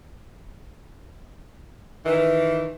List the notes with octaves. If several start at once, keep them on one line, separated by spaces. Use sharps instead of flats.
D#3 E3